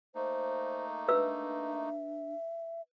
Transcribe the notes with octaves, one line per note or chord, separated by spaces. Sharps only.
A3 A#3 D#4 C5
D4 B4 E5 E6